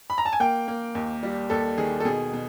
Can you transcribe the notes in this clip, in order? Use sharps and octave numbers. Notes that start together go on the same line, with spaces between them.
B5
A#5
A5
G#5
A#3 G5
A#3
D#2
G3
D#2 A4
D#3 G#4
A4
B2 G#4
B2